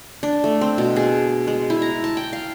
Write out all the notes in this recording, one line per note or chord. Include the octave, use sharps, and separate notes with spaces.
D4
A3
C4
B2
G#4
G#3
E4
A#5
A5
G5
F5